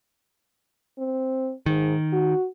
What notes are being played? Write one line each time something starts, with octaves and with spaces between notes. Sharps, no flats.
C4
G#2 D#3
F#4